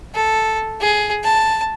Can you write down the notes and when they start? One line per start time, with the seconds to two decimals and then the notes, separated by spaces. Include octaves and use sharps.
0.15 A4
0.80 G#4
1.23 A5